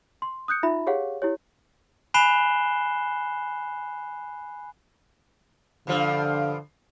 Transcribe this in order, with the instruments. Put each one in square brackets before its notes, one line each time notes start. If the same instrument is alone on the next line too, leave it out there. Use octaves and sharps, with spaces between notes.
[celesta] C6
D#6 F#6 G6 C#7
D#4 F4 E5 B5
G4 G#4 C#5 F5 F#5
E4 G4 C#5
[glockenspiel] G#5 B5 F#6 C7 E7 G7
[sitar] G2 F3 [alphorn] D3